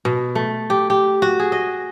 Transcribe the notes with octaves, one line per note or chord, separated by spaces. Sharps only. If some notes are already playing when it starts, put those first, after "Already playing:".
B2
A3
G4
G4
F#4
G#4
D#5